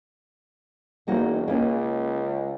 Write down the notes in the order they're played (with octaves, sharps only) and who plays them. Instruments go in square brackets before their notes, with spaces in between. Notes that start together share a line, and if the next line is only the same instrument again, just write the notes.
[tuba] E1 [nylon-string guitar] A#3 D#4 F#4
[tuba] C#2 [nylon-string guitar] A#3 C#4